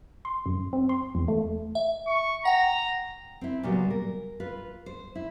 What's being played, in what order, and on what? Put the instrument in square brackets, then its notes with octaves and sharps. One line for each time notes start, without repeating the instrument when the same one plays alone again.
[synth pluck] C6
F#2
C4
C6
E2
A3
[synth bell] E5
[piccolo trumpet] C#6
[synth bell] F#5 G5 [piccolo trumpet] A#5
[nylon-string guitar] C4 E4
A#2 C#3 F#3 G3 B3
A#4
F4 B4
C5
E4